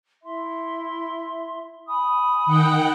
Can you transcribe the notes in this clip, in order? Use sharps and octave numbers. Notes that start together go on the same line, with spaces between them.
E4 E5 C6
G#5 B5 D#6
D#3 F#5 G5